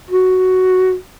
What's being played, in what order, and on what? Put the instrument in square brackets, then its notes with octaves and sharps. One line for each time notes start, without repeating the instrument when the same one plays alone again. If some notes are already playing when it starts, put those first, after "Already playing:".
[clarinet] F#4